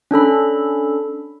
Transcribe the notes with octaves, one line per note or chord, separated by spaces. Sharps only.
C#4 D4 A4 B5